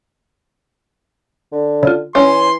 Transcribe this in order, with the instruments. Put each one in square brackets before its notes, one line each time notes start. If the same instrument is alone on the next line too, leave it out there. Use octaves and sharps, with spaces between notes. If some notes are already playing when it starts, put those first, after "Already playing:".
[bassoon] D3
[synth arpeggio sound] C#3 F4
[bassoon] E3 [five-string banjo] C#4 [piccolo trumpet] C6